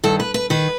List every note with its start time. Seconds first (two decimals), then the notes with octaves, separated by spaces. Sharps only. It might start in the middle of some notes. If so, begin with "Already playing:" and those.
0.04 G2 D#3 A4
0.20 B4
0.34 B4
0.50 D#3 B4